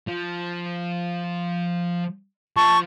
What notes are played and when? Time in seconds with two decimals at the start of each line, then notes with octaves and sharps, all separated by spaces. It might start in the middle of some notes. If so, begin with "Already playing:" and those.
0.07 F3
2.57 F3 A5 C#6